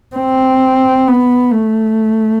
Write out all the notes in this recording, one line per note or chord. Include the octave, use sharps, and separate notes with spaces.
C4
B3
A3